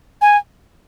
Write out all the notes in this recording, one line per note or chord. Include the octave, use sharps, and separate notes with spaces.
G#5